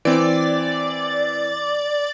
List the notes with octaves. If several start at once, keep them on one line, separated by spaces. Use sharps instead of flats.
E3 C4 D5